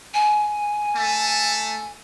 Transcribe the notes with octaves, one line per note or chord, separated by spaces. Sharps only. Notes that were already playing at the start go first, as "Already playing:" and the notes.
G#5
A3 A5